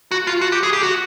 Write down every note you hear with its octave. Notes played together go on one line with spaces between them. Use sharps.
F#4
F4
F#4
G4
G#4
G4
F#4